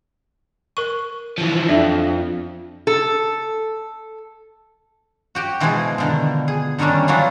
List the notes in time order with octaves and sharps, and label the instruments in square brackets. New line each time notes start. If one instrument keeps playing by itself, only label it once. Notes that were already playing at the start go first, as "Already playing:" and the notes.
[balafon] A#4 C#6
[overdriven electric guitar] E3 F3
[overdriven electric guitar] F2 [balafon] D4 D5 E5
[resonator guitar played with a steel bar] A4
[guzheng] F#4 G4 G5
B2 E3 F3 G#3 F4 G#4
B2 D3 D#3
G#4
D3 D#3 G3 C#4 D4
E3 F#3 B3 C#4 D4 F4